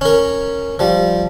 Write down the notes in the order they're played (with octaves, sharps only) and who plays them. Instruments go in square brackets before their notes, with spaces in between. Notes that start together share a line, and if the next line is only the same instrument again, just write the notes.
[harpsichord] C#4 A#4
F3 G3